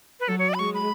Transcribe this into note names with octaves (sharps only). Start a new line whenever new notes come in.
B4
F#3 A4
C#5
D5
B5
G#3 C#6
B5